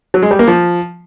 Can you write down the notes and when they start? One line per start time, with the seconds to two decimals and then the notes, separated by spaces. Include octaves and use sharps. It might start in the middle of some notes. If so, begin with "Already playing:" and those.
0.14 F#3
0.22 G#3
0.31 G3
0.39 A#3
0.48 F3